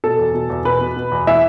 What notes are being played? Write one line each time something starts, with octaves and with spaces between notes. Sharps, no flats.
B2 A4
E2
B2
E2
B2 B4
B2
B2
E2
E3 E5